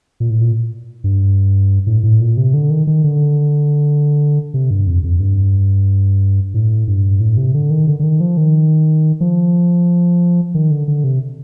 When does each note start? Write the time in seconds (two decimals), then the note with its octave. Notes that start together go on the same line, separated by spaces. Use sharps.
0.20 A#2
0.30 A2
0.41 A#2
1.04 G2
1.87 A2
2.03 A2
2.20 A#2
2.37 C3
2.54 D3
2.70 D#3
2.87 D#3
3.04 D3
4.54 C3
4.70 G2
4.87 F2
5.04 F2
5.20 G2
6.54 A2
6.87 G2
7.20 A2
7.37 C3
7.54 D3
7.70 D#3
7.87 D3
7.99 D3
8.03 D#3
8.20 F3
8.37 D#3
9.20 F3
10.54 D#3
10.71 D3
10.88 D3
11.04 C3